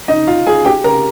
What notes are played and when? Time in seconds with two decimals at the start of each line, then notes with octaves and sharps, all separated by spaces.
0.08 D#4 D#5
0.27 F4 F5
0.47 G#4 G#5
0.65 G4 G5
0.84 A#4 A#5